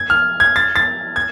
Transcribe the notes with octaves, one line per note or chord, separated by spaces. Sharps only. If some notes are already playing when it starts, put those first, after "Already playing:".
Already playing: G#6
F6
G#6
A6
A6
G#6